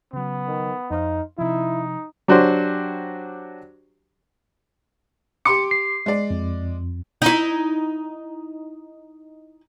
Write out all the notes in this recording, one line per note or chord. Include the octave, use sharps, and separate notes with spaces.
C#3 F#3 B3
D#3
F2 D#4 C5 F5
C3 F3 D#4 E4
F#3 D4 F#4 G4 C5
G4 C6 D6 C#7
C7
G#3 D5
F2
D#4 E4